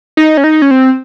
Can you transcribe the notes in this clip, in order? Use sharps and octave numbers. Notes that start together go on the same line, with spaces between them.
D#4
C#4
D#4
C#4
C4